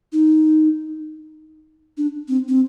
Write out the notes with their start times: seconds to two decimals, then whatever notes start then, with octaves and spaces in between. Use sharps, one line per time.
0.13 D#4
1.97 D4
2.28 C4
2.48 C4